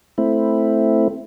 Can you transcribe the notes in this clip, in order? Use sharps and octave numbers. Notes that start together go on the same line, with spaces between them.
A3 C4 E4